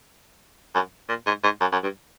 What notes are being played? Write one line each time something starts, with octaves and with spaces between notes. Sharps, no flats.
F#2
A#2
G#2
G#2
F#2
F#2
G2